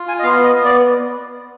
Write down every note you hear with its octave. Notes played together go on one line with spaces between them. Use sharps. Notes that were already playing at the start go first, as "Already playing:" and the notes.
Already playing: F4
G#5
D#5
B3 F5
D#5
B3
D5